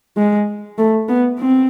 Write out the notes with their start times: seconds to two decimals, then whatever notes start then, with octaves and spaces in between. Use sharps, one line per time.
0.17 G#3
0.78 A3
1.09 B3
1.39 C4